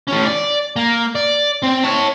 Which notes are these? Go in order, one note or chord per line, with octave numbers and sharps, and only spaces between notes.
A2 C#4
D5
A#3
D5
C4
C#5 A5